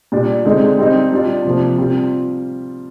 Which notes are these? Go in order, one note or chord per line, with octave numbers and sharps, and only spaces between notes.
A#2 G3 D4
D3 G#3 C4 D#4
G3 C4 D#4
G3 D4 F4
C3 F3 A#3
G3 C4 F4